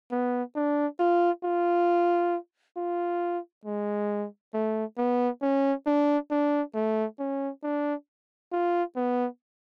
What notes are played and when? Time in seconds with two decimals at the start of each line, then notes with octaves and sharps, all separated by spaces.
0.12 B3
0.56 D4
1.00 F4
1.44 F4
2.77 F4
3.65 G#3
4.54 A3
4.98 B3
5.42 C#4
5.86 D4
6.31 D4
6.75 A3
7.19 C#4
7.63 D4
8.52 F4
8.96 B3